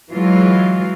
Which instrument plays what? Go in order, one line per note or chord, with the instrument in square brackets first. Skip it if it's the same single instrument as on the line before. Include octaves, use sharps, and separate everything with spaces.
[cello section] E3 F#3 G#3 F4